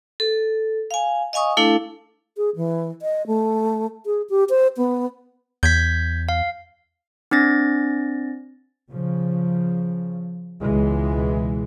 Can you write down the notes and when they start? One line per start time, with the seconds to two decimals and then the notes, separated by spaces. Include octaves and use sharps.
0.20 A4
0.91 F5 G#5
1.33 D#5 F5 G#5 C#6 D#6
1.57 A3 D4 E4 A4 F5 D6
2.37 G#4
2.56 E3
3.02 D#5
3.27 A3
4.06 G#4
4.30 G4
4.50 C5
4.77 B3
5.63 E2 G6 G#6 B6
6.29 F5
7.31 C4 D4 A6 A#6
8.89 C#3 F3
10.62 C#2 B2 E3 G#3